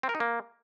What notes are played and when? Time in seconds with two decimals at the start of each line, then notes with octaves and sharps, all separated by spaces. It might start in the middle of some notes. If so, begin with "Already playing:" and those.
0.03 C4
0.09 A#4
0.15 D#4
0.20 A#3